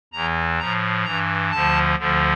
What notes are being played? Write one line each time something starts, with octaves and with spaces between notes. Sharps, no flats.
E2 E3 A#5
A2 F3 A#5
G2 E3 A#5
D2 D3 F3 A5
D2 D3 F3